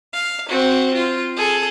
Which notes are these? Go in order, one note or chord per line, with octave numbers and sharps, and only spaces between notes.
F5
C4 F#4
F4
G#4 A4